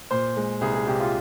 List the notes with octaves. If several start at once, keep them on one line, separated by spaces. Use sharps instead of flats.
A#2 C5
G#3
C2 G#4
G#4
C2 G4
F4